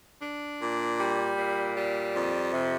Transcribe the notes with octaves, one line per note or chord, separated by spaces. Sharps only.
D4
A#2
G3
A#2
G3
F2
C3